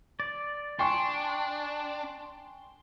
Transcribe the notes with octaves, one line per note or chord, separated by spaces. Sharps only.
D5
D4 G5 G#5 C6 C#6